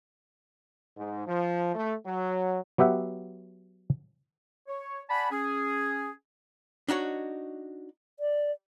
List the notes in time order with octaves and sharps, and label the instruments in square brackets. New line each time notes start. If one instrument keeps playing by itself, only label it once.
[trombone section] G#2
F3
A3
F#3
[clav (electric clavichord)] F#3 B3 G4 E5 F#5
[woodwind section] C#5
D5 F#5 G#5 A5 B5
C#4 G#4
[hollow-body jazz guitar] D4 D#4 F#4 C#5
[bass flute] D5